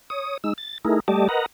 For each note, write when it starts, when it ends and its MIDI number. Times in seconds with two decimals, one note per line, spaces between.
0.10 0.38 73
0.10 0.38 87
0.44 0.53 56
0.44 0.53 63
0.44 0.53 88
0.58 0.78 93
0.85 1.00 57
0.85 1.00 63
0.85 1.00 64
0.85 1.00 68
0.85 1.00 70
1.08 1.28 55
1.08 1.28 57
1.08 1.28 67
1.08 1.28 74
1.08 1.28 75
1.08 1.28 81
1.29 1.46 70
1.29 1.46 71
1.29 1.46 75
1.29 1.46 78
1.29 1.46 82